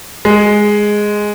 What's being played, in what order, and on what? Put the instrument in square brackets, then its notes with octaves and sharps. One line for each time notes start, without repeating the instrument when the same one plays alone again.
[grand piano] G#3